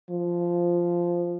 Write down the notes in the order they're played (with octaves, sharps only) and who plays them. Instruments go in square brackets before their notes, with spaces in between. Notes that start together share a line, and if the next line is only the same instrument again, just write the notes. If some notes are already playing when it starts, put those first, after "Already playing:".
[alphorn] F3